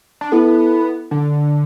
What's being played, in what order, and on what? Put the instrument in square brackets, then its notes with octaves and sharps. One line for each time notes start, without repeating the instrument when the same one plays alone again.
[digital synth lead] D4
[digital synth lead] B3 [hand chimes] E4 A4
[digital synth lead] D3